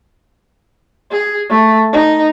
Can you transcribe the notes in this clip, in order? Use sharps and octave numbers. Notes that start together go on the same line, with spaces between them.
G#4
A3
D#4